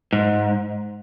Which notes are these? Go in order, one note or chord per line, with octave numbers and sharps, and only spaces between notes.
G#2